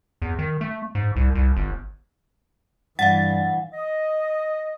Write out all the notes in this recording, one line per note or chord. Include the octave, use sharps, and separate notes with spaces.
E2
D#3
A3
G#2
C2
C2
G1
G2 E3 F5 F#5 A6
D#5